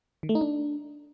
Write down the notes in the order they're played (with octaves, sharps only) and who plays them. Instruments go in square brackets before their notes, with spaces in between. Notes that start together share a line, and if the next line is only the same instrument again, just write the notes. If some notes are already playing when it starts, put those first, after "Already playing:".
[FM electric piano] D#3
A3
D#4
D4